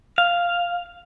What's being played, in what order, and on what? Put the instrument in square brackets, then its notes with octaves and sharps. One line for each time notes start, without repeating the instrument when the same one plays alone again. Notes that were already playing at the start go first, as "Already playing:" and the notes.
[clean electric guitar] F5